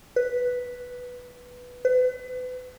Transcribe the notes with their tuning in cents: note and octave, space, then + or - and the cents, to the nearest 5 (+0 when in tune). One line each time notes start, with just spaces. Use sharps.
B4 +0
B4 +35